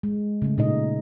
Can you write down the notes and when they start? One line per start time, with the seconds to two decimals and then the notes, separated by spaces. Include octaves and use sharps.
0.03 G#3
0.42 C#3 A3
0.58 A#2 D#4 D#5